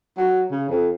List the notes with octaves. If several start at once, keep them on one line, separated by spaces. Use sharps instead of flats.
F#3
C#3
F2